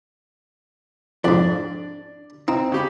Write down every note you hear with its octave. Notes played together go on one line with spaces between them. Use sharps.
F2 G#2 D4 D5
C4 D#4
C#3 G4 B5